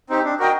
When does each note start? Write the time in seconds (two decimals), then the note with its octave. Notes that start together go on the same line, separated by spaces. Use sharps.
0.09 C4 D#4 G4
0.25 D4
0.39 F#4 A#4 D#5 G5